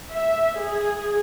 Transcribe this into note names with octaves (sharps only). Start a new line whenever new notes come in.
E5
G#4